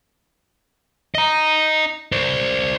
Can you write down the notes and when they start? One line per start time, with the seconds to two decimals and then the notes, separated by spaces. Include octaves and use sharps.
1.15 D#5 A#5
2.12 C5 D5